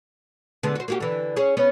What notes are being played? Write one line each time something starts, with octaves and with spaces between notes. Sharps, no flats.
D3 G#3 B3
F#4 C5
A#3 F#4 G4
D3 E3
C#4 G#4 C#5
B3 C#4 C#5